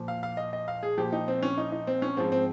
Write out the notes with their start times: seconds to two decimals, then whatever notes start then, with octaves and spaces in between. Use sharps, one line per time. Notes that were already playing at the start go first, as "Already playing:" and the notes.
Already playing: A#2 F3
0.08 F5
0.23 F5
0.37 D#5
0.53 D#5
0.68 F5
0.83 G#4
0.97 A#2 F3 G4
1.13 D#4
1.28 C4
1.42 C#4
1.58 D#4
1.72 D#4
1.87 C4
2.02 C#4
2.17 G#2 F3 C4
2.32 C4